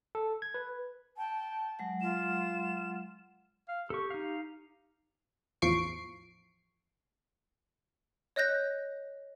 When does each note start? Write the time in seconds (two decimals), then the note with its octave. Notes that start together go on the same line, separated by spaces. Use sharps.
0.15 A4
0.42 G#6
0.54 B4
1.17 G5 A5
1.79 F#3 G#3 F#5
2.01 F4 E7
3.68 F5
3.90 G4 A4 C#6
4.10 D#4 F5
5.62 A1 E2 F3 C#6 C7 D7
8.36 C#5 D#5 F#6 G6 A#6